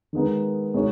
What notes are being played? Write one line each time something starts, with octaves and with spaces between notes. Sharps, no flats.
D#3 G#3 B3 D#4
B2 G#3 D#4 F#4 C#5